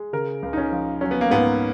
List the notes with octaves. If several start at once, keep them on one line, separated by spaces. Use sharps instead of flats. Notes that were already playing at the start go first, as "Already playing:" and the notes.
Already playing: G#3
C#3 A#4
C#2
D#4
C#4
F3
F#3 C#4
B3
A#3
G#2 B3